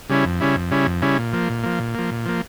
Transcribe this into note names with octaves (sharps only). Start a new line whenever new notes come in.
C#3 G3 C#4 E4
F2
C#3 G3 C#4 E4
F2
C#3 G3 C#4 E4
F2
C#3 G3 C#4 E4
A#2
F3 A#3
A#2
F3 A#3
A#2
F3 A#3
A#2
F3 A#3